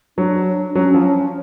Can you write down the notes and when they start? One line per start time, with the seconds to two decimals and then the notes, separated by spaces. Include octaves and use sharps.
0.18 F#3 D4
0.75 F#3 C#4
0.95 F3